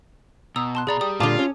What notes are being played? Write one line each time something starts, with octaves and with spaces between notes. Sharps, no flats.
B2 A#5 D#6 E6
A5 C6 F#6
B2 G#4 D5 A#5 B5
G4 D5 D#6
A#2 D3 F4 A5 D6 D#6
C#4